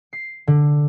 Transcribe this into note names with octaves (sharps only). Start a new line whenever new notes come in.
C7
D3